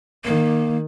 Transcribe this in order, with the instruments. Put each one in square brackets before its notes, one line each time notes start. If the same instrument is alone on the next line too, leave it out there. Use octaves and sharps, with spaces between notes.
[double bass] D#3 [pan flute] A#3